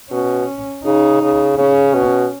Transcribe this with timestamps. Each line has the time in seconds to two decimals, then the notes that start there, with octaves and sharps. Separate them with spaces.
0.11 B2 C#4
0.85 C#3 D#4
1.22 C#3
1.58 C#3 C#4
1.94 B2